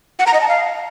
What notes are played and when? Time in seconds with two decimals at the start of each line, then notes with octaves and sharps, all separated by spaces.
0.19 F#5
0.27 A#5
0.34 D#5
0.41 A5
0.49 F5